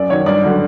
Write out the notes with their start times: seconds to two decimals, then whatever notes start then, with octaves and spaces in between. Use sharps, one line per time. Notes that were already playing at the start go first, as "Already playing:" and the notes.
Already playing: F#2 D5
0.09 D#3 F#3 C#5
0.26 G2 D5
0.43 D3 F#3